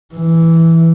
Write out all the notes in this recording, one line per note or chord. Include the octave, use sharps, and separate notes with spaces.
E3